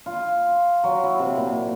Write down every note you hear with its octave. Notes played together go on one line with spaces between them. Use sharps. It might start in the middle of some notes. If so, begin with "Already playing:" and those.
F4
F#3
E4
C3
A#2